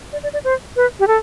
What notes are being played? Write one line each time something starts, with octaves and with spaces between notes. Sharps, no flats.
D5
D5
D5
C5
B4
G4
A4